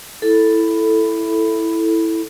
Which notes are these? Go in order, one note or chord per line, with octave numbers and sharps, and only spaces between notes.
E4 A4